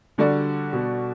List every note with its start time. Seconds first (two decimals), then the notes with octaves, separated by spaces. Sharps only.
0.18 D3 G3 D4 F#4 A4 D5
0.73 B2